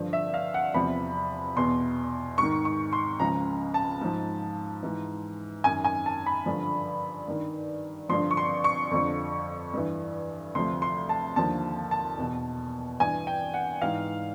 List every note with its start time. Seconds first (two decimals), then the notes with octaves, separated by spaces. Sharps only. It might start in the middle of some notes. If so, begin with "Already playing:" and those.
Already playing: G2 D3 F3
0.13 E5
0.34 F5
0.54 F#5
0.74 E2 C3 F3 B5
1.56 E2 B2 C6
2.38 G#2 D#3 C#6
2.65 C#6
2.93 C6
3.20 C#2 C#3 F3 A#5
3.74 A5
4.01 G#2 F3
4.83 G#2 E3
5.64 F#2 D#3 G#5
5.84 G#5
6.06 A5
6.26 B5
6.46 G2 D3 F3
7.28 G2 D#3
8.09 G2 D3 F3 C6
8.31 C#6
8.37 C6
8.64 C#6
8.91 F2 D3 F3
9.74 G2 E3
10.55 D2 C3 F3 C6
10.82 C6
11.09 A5
11.36 D#2 D3 F3 A5
11.91 A5
12.18 E2 B2
13.00 G2 E3 G#5
13.27 G5
13.54 F#5
13.81 G#2 E3 F5